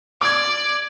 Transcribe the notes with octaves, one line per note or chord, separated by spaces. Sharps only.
D5 D6 G#6